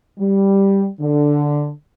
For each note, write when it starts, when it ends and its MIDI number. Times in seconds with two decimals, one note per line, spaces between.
0.19 0.88 55
1.00 1.70 50